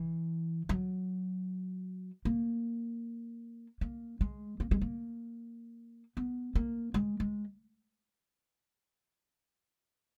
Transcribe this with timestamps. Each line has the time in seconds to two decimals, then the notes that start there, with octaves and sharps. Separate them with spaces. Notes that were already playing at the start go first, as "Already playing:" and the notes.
Already playing: E3
0.69 F#3
2.25 A#3
3.81 A#3
4.21 G#3
4.60 A#3
4.71 G#3
4.81 A#3
6.17 B3
6.55 A#3
6.94 G#3
7.20 G#3